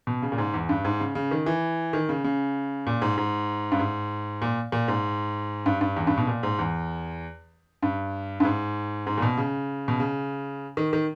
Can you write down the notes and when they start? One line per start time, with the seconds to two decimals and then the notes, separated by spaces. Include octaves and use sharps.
0.07 B2
0.23 C#3
0.32 A#2
0.38 G#2
0.54 E2
0.69 G2
0.85 G#2
1.00 C#3
1.15 C#3
1.31 D#3
1.46 E3
1.93 D#3
2.09 C#3
2.24 C#3
2.87 A#2
3.02 G#2
3.17 G#2
3.72 G2
3.79 G#2
4.42 A#2
4.72 A#2
4.88 G#2
5.66 G2
5.81 G2
5.96 E2
6.07 G2
6.18 B2
6.27 A#2
6.43 G#2
6.59 E2
7.82 G2
8.40 G2
8.45 G#2
9.07 G#2
9.18 A#2
9.22 B2
9.38 C#3
9.88 B2
10.00 C#3
10.77 D#3
10.93 D#3